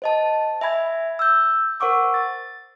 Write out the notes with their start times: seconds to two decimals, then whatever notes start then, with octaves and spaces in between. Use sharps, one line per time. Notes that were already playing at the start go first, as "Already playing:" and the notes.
0.02 C5 D#5 A5
0.61 E5 G#5 B5 G#6
1.19 E6 G6
1.80 A#4 C5 F#5 C#6 D6 E6
2.14 A6